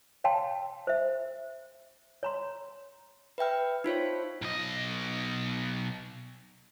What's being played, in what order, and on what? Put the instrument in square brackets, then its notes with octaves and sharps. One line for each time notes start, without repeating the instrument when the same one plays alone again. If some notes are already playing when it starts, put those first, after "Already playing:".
[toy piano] C#5 F5 G5 A5 C6
C5 E5
C#5 A#5 C6
[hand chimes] B4 E5 G5 F6
D#4 F4 C5 C#5
[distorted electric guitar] B1 D#5